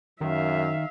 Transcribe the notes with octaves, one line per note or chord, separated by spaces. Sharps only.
F#2 D#3 E5 F5